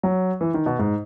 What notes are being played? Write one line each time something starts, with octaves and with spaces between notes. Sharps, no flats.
F#3
E3
D#3
B2
G#2